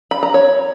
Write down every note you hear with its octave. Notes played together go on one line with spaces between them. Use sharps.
B5
A#5
C#5